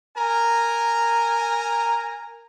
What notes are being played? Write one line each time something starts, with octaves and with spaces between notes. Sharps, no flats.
A#4 G#5 A#5